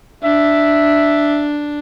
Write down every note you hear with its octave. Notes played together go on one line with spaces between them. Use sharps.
D4 E5